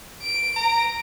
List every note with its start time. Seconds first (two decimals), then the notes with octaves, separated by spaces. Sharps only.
0.22 D7
0.56 A#5